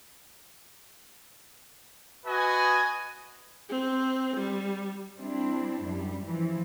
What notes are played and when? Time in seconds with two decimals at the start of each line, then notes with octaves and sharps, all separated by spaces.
2.26 F#4 B4 D#5 G#5
3.70 C4
4.37 G3
5.20 G3 C4 D4 E4
5.85 F#2 G3
6.28 E3 F3